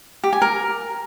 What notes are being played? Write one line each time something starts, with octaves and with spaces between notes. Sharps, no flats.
G4
G#5
A#4